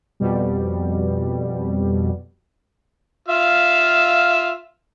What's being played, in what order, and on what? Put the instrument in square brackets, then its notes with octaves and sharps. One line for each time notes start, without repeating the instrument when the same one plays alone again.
[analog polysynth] F2 B2 G3
[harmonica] F4 E5 F5